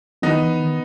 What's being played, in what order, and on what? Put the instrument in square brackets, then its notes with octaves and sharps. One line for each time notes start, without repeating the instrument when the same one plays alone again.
[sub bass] D#3 [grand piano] B3 D#4
[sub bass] E3
D#3